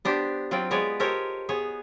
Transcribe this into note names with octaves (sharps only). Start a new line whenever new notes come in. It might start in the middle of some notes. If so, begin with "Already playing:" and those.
B3 D4 G4 C5
F#3 C4 F4 D5 G5
G#3 B3 B4 C#5 D5
G4 A4 A#4 C5 C#5 D#5
B3 G#4 C#5